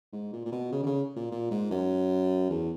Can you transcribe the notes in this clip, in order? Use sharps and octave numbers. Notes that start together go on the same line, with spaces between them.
G#2
A#2
A#2
B2
C#3
D3
C#3
A#2
A#2
G#2
F#2
E2